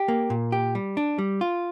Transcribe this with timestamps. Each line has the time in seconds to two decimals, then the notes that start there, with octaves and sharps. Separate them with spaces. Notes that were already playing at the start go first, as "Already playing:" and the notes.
Already playing: G4
0.08 A#3
0.30 A#2
0.52 G4
0.75 G3
0.97 D4
1.19 G3
1.41 F4